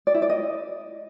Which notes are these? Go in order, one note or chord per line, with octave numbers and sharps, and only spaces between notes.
D5
E4
D5
D#5